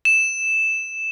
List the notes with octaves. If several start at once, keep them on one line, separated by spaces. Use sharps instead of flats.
E7